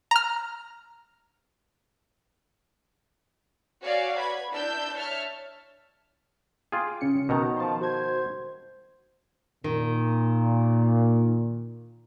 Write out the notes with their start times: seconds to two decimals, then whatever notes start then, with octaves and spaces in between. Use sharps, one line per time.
0.11 A#5 F6
3.82 F#4 C#5 D5 F5 G#5
4.18 B4 B5 G#6
4.51 D4 E4 E6 G6
4.94 C#5 E5 A5 F6
6.72 F4 G#4 G5 D6
7.01 C#3 C#4 C#7
7.29 B2 D#3 A5 A#5
7.57 F3 C5 A5
7.81 F#4 C5 G#6
9.64 A#2 D#3